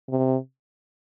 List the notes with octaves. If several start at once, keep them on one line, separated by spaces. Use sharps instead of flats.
C3